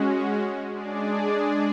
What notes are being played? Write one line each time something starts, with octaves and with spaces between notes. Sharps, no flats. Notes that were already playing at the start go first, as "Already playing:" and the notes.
Already playing: G#3 C#4 F#4
G#3 D4 G#4 D5